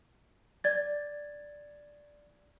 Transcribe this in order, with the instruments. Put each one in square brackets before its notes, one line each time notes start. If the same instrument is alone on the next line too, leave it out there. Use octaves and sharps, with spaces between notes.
[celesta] D5 G#6 A6